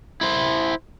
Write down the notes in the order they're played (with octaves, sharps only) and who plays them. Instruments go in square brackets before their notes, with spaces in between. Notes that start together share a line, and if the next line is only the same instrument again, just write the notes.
[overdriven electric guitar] E4 C5